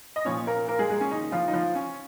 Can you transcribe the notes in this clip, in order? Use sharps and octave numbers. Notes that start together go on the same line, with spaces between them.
D#5
A#2 F3 C#4 C#5
A#3 A#4
A#3 A#4
G#3 G#4
G#3 G#4
C#4
D#3 D#4
F3 F4
D#4
F3 F4
C#4